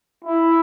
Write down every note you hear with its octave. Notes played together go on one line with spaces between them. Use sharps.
E4